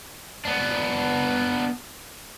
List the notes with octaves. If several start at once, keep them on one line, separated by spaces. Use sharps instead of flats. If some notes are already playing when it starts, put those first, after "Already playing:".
B3 D4